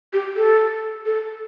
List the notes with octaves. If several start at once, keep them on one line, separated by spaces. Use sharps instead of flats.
G4
A4
A4